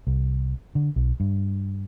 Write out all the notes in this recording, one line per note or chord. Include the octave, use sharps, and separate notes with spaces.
C2
D3
B1
G2